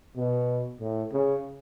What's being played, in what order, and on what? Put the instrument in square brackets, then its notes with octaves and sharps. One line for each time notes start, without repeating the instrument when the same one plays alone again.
[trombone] B2
A2
C#3